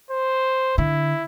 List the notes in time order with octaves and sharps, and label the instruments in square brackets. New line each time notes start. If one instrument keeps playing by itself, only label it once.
[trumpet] C5
[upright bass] D3 [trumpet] E4